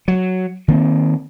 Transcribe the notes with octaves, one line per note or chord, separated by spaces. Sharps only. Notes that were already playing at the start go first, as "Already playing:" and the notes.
F#3
D#3 A#3 C4